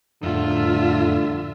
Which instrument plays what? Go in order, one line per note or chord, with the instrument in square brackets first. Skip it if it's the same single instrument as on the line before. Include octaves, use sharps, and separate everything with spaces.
[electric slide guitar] F2 A2 [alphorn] D3 [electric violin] F4 E5